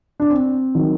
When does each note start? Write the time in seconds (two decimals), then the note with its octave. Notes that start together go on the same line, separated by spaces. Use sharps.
0.20 D4
0.30 C4
0.75 D#3 F#3